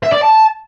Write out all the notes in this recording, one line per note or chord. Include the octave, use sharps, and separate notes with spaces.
E5
D5
A5